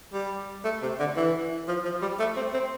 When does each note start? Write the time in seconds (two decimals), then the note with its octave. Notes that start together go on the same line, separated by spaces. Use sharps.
0.13 G3
0.65 A3
0.82 C3
0.99 D3
1.16 E3
1.68 F3
1.85 F3
2.02 G3
2.19 A3
2.36 C4
2.53 C4